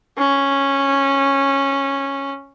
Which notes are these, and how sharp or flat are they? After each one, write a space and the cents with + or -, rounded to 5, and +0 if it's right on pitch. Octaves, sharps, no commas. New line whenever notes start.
C#4 -10